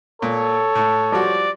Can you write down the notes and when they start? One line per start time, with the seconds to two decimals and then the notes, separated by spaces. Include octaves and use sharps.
0.22 A#2 A4 C#5
0.75 A2
1.12 F3 G3 F#4 D5